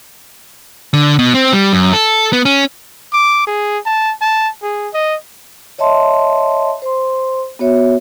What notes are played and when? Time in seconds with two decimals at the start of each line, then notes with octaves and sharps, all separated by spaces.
0.93 D3
1.19 B2
1.34 C4
1.53 G3
1.73 F#2
1.93 A4
2.33 B3
2.45 C#4
3.13 D6
3.47 G#4
3.86 A5
4.21 A5
4.63 G#4
4.94 D#5
5.78 C#5 D#5 E5 A5 C6
6.82 C5 C6
7.59 B3 F#4 C#5 E5